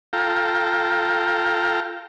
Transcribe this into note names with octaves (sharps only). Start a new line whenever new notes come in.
F4 A4 G5 A#5